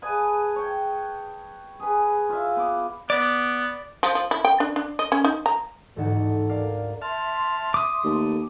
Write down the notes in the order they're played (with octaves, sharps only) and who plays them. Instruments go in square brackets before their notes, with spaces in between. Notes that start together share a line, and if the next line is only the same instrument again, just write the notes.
[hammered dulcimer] G#4 B4 G#5 A5
C#5 G5
G#4 B4
F4 E5
B3 D6
[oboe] B3 [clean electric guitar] D5
[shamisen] F3
F3
E4
G5
D4
D4
D#5
C#4
D#4
A#5
[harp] A1 D2 G#2 D#4 A4 F#5
A#4 D5 F5
[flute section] E5 C6 [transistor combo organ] A5 F6
[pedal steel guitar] D6 D#6
[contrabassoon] D#2 [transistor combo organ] A3